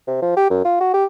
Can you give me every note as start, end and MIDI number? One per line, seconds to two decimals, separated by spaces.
0.08 0.20 48
0.22 0.35 53
0.37 0.49 67
0.50 0.60 42
0.65 0.78 65
0.81 0.91 66
0.94 1.05 67